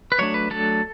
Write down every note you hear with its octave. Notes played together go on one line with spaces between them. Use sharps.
B4
F#3 A3 D4 C#5
B4
F#3 A3 D4 A4